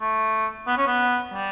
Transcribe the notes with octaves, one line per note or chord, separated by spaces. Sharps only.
A3
B3
C#4
B3
G3